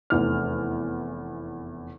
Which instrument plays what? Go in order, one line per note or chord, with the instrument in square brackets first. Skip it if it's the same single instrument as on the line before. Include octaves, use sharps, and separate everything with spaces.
[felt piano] F1 E2 F6